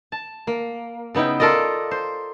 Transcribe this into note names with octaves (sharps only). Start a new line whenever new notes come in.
A5
A#3
C#3 B3 D#4 E4 G5
F4 A4 A#4 D5 D#5
C5